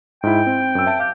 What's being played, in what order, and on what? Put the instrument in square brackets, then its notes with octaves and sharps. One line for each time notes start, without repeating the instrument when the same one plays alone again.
[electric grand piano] G#2 E4 [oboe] G5
[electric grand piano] C4
F#2 E6
E5 A5 D7
[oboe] G4 [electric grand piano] F5